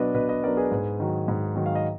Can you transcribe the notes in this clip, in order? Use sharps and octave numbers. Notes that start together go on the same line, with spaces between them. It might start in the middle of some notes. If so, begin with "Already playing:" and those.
Already playing: B2 F#3 B3 D4 B4 D#5
B2 B4 D#5
B4 D#5
F#3 B3 D4 A#4 D5
G#4 B4
G#2
D#3 F#3
G#2
D#3 F#3
F5
D#5